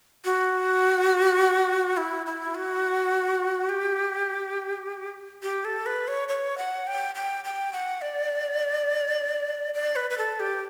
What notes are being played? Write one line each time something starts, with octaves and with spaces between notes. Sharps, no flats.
F#4
E4
E4
F#4
G4
G4
A4
B4
C#5
C#5
F#5
G5
G5
G5
F#5
D5
D5
B4
B4
A4
G4